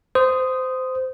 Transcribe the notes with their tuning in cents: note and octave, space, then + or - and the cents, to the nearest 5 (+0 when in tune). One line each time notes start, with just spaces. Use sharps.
C5 -20 D#6 +0